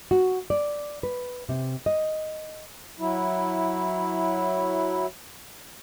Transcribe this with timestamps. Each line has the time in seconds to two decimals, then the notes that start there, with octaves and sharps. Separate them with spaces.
0.11 F#4
0.50 D5
1.03 B4
1.49 C3
1.86 D#5
2.99 F#3 E4